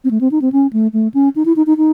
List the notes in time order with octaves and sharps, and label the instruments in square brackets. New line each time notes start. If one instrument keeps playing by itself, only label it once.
[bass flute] C4
A3
C4
D#4
C4
C#4
A3
A3
C#4
D#4
E4
D#4
D#4
D#4